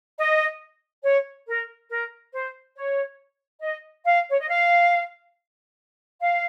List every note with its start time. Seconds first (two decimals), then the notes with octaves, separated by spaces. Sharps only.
0.18 D#5
1.03 C#5
1.47 A#4
1.90 A#4
2.33 C5
2.76 C#5
3.61 D#5
4.05 F5
4.29 C#5
4.38 D#5
4.48 F5
6.20 F5